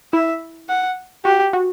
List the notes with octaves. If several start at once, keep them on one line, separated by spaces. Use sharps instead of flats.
E4 E5
F#5
F#4 G4
F#4